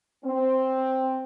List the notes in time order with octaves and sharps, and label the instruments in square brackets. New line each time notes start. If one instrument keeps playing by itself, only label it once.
[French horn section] C4